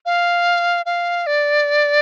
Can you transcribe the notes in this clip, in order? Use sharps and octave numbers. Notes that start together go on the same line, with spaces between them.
F5
F5
D5